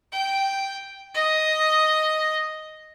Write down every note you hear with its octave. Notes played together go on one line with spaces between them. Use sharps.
G5
D#5